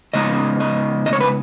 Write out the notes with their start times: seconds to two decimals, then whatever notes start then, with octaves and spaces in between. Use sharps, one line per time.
0.14 C#3 G#3 B3 D#4 D#5
0.60 D#5
1.06 D#5
1.13 C#5
1.21 B4